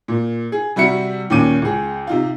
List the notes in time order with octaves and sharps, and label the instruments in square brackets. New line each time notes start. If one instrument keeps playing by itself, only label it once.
[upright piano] A#2
G#4
C3 G3 F#4 E5 C#7
D#2 A#2 C#4 D6 D#7
C#2 G#4
C3 D#4 F4